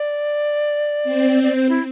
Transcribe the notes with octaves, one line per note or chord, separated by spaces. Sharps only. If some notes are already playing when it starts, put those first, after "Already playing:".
Already playing: D5
C4
D5
C5
E4